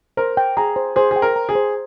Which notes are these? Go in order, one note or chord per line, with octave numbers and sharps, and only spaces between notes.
A#4 C5
G5
G#4 A#5
C5
G#4 C5
G#4
G5
A#4
A#5
G#4
C5